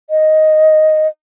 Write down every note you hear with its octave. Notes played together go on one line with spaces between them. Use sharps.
D#5